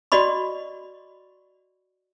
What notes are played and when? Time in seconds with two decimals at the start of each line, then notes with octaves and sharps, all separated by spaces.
0.12 F#4 D5 D#5 B5 C#6